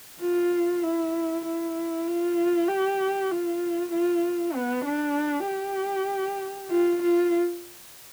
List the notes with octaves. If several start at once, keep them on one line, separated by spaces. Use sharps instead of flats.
F4
E4
E4
F4
G4
F4
F4
B3
D4
G4
F4
F4